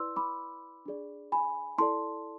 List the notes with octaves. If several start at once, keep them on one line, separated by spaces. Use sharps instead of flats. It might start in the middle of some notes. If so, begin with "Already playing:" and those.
Already playing: E4 B4 D5 C6 E6
B5 D6
D4 G#4 D5
G#5 B5
E4 A4 D5 A5 C6